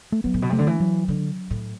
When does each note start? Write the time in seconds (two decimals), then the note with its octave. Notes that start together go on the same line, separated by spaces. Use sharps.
0.12 A3
0.24 F#3 B3
0.34 A2
0.42 B2
0.49 C3 A3
0.58 D3
0.67 E3
0.80 F#3
1.08 D3
1.50 A2